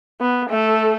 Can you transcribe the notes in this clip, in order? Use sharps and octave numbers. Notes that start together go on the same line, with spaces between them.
B3
A3 A4